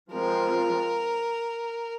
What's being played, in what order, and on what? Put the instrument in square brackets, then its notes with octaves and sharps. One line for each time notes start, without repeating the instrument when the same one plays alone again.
[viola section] F3 G#3 C4 F4 [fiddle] A#4